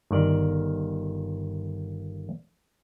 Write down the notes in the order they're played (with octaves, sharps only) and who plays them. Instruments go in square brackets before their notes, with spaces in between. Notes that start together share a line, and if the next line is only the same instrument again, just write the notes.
[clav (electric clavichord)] G1 D#3 D5